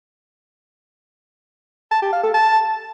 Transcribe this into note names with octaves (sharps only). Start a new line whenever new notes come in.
A5
G4
F5
A4
A5